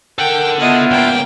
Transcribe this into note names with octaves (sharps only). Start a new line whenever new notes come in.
A4 A#4 F#5 G5
B3 D4 E4 F4 D#5
C#2 A#3 G5